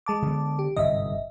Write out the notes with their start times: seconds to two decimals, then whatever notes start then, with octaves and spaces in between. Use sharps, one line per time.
0.06 G#3 A5 D6
0.22 D3 B3
0.59 G4
0.76 G1 G#2 C3 D#5 E5